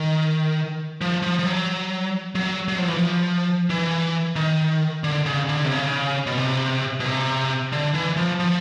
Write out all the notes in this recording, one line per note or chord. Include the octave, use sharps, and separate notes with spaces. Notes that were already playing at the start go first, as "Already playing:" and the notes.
Already playing: D#3
F3
F3
F3
F#3
F#3
F#3
F3
E3
F3
E3
D#3
D3
C#3
D3
C3
C#3
B2
C3
B2
C3
D3
E3
F3
F3